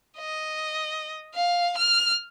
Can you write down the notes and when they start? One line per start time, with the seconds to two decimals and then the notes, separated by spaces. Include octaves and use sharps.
0.18 D#5
1.35 F5
1.78 F6